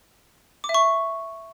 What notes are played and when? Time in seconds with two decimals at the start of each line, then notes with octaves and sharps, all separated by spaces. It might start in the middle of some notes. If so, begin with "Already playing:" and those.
0.64 D6
0.69 E5
0.74 C#6